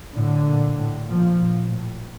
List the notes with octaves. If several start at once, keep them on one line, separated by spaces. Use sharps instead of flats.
A2 D3
A#2
A2
A#2 F3
A#2
A2